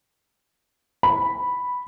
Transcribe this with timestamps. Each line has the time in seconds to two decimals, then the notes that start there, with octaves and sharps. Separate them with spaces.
1.03 B5